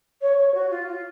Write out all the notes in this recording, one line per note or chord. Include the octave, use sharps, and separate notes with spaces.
C#5
C#5
F#4
F4
F4